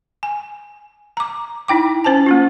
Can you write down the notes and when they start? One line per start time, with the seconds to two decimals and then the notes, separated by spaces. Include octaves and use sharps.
0.23 G#5
1.17 A#5 D6
1.68 D#4 E4 G5 D6
2.04 C#4 C5 G#5 A5
2.26 A#3 C#4 F4